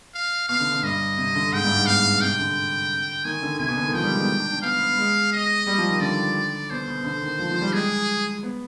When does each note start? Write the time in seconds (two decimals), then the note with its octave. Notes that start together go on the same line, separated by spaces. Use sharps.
0.14 F5
0.49 B2 F5
0.60 D3
0.72 D3
0.83 G2 D#5
1.17 C3
1.35 D3
1.52 G#2 G5
1.64 G2
1.76 G#2
1.86 B2 F5
2.21 C3 G5
2.39 D3
3.25 D#3 G#5
3.42 D3
3.59 C3 G#5
3.68 B2
3.76 D3
3.86 D#3
3.94 F3 G5
4.03 G3
4.11 G#3
4.20 B3
4.40 D4
4.51 D4
4.62 B3 F5
4.80 B3
4.98 G#3
5.32 D#5
5.67 G3
5.78 F3
5.89 D#3
6.00 D3 D5
6.70 B2 C5
6.88 B2
7.04 D3
7.22 D#3
7.39 F3
7.51 F3
7.62 G3
7.73 G#3 G#4
8.43 B3